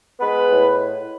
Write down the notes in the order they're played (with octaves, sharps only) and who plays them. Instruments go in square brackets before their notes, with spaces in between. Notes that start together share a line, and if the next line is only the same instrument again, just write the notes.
[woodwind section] G#3 B3 B4
A2